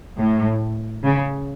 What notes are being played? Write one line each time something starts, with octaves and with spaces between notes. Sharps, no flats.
A2
C#3